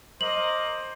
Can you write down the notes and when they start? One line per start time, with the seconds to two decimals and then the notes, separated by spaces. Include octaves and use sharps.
0.21 A#4 C5 D#5 D6 F#7